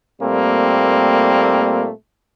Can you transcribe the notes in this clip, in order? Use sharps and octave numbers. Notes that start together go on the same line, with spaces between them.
A#2 G3 A3 A#3 C4